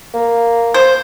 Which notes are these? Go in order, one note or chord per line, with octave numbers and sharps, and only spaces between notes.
A#3
C5